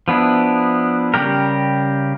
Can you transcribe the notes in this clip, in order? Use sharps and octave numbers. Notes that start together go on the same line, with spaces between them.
F3 B3 D4 E4
C#3 G3 G4 A#4